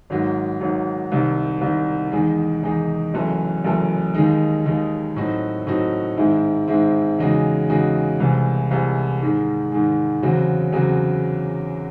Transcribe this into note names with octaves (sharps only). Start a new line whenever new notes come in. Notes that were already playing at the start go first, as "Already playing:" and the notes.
G#1 G#2 F#3
G#1 G#2 F#3
C2 C3 D#3
C2 C3 D#3
E2 D#3 G#3 D#4
E2 D#3 G#3 D#4
F#1 F#2 E3 A3
F#1 F#2 E3 A3
D#2 D#3 G#3 D#4
D#2 D#3 G#3 D#4
A2 F#3 C4 D#4 F#4
A2 F#3 C4 D#4 F#4
G#2 D#3 G#3 C4 E4
G#2 D#3 G#3 C4 E4
E2 C#3 G#3 D#4 F#4
E2 C#3 G#3 D#4 F#4
C2 C3 E3 G#3
C2 C3 E3 G#3
G#2 D#3 G#3
G#2 D#3 G#3
E2 C#3 F#3 C4 F#4
E2 C#3 F#3 C4 F#4